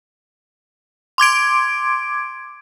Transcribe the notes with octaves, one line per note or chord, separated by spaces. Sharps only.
C6 D6 G#6 D7